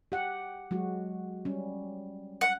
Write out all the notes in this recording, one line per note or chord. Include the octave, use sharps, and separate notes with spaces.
G4 F#5
F#3 G#3 F#4
G3 C#4
F#5